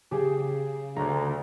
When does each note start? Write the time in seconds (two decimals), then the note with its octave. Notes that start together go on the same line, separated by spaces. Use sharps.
0.11 C#3 G4 G#4
0.96 D2 A#5